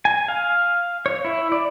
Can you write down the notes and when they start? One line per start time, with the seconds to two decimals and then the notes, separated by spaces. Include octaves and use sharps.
0.05 G#5
0.28 F5
1.06 C#5
1.25 E4
1.52 D5